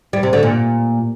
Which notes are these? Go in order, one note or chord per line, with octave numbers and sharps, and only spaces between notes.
G3
C3
D3
A#2